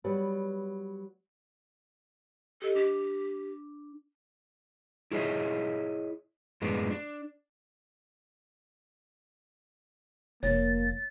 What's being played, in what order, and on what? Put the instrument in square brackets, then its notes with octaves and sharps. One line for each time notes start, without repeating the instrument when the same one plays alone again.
[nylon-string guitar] F#3 G3 B3
[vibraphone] G4 D#5 [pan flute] A4
[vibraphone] D4 [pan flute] G4
[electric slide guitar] E4 G#4 C#5 D#5 E5
F#2 A2 G#3 B3 D4
D4
[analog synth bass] F1 [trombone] A#3 [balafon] C#5 [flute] A6